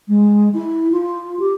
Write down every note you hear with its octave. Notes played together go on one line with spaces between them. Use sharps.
G#3
E4
F4
G4